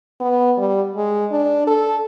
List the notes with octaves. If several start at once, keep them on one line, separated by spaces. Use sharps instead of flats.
B3
G3
G#3
D4
A4